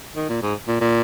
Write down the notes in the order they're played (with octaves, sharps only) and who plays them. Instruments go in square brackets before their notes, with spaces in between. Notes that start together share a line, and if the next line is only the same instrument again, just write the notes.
[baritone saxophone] D#3
A#2
G#2
A#2
A#2